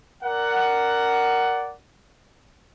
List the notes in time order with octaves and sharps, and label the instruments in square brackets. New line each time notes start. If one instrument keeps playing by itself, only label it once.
[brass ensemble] A#4 D5 F#5